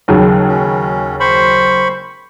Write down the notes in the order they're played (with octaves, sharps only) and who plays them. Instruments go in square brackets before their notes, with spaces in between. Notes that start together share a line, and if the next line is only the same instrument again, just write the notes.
[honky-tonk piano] D#2 C#3 F#3
[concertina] C#4
C5 B5 C#6